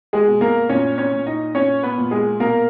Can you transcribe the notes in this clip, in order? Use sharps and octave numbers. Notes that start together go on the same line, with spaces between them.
G#3 G#4
B2
A#3 A#4
A#2 C#4 C#5
C#4 C#5
A#2
D#4 D#5
A#2 C#4 C#5
B3 B4
A#2
G#3 G#4
B2 A#3 A#4